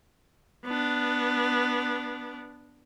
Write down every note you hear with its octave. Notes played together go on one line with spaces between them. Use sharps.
B3 D4